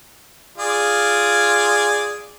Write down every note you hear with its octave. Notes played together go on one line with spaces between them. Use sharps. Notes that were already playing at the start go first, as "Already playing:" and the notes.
F4 G#4 D5